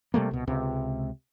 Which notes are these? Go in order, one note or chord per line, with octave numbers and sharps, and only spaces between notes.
C3 G3 A3 A#3
C2 B2
C#2 C3